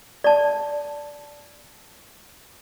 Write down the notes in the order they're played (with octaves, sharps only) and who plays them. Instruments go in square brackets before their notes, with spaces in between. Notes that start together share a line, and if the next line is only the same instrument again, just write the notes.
[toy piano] D5 A5